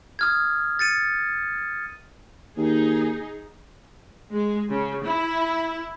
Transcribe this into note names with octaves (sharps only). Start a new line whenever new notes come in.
D#6 F6 G#6
A6 C#7 D#7
D#2 D#4 G#4
G#3
C#3
E4